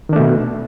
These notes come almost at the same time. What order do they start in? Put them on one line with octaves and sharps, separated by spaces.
D#3 D4 A3 B2